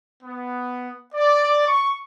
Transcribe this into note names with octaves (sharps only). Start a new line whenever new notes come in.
B3
D5
C#6